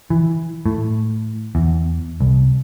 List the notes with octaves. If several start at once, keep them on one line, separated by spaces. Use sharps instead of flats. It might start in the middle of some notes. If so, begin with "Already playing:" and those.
E3
A2
E2
C2